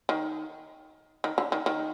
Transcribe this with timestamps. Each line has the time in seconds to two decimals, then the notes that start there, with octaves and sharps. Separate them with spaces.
0.09 D#3
1.24 D#3
1.38 D3
1.52 D#3
1.66 D#3